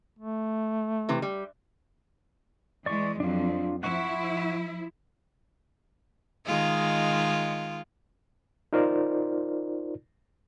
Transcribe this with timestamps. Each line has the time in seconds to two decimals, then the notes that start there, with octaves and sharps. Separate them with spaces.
0.19 A3
1.09 C3 E3
1.22 G3
2.86 E3 G#3 D5 C#6
3.20 F2 F#3 D4 F4
3.83 F3 E4 F#5 C#6
6.46 D#3 G#3 F4
8.73 D#4 F4 A#4 C5 D5